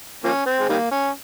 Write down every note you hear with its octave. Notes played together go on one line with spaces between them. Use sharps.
F3 A#3 C#4
C4
G#3
D#3 G3 A#3
C#4